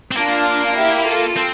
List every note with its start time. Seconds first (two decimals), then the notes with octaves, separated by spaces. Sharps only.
0.11 C4
0.17 A#3 D4 F4
0.77 E4 G4
1.07 F4 A4
1.37 C4